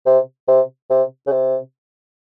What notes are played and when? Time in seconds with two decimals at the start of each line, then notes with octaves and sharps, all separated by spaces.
0.06 C3
0.48 C3
0.90 C3
1.27 C#3
1.32 C3